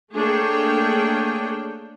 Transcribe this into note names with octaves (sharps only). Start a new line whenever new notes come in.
A3 A#3 D4 G#4 C#5 G5